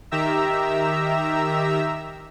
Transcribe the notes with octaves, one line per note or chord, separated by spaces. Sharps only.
D#3 G4 E5 A#5 E6